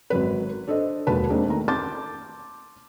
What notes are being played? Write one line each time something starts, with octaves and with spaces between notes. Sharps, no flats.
G#1 F#3 B4
D4 A4 C5 D#5
E1 D#2 F#4 B4 A5
G#3 A#3 C4 D4 D#4
D#3 A3 A#5
A5 C6 D6 G6 A6